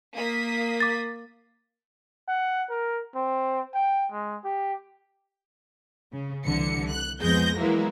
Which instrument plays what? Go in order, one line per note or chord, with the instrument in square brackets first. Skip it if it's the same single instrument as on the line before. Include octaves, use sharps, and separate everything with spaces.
[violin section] A#3 D#6 B6
[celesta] D6 A6
[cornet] F#5
A#4
C4
G5
G#3
G4
[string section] C#3
C2 D3 E3 C#7
F#6
F2 G#3 B3 G#4 G6 A#6
E3 F#3 G#3 A#3 B3 E4